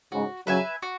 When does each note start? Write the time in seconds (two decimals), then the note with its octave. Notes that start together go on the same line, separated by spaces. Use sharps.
0.12 G#2 C#3 F#4
0.47 C#3 F#3 B4 E5 G#5
0.83 F#4